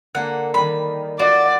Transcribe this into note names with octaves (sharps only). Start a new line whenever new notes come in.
D3 A#3 A4 F#5
D#3 G3 B5
F4 F#4 D5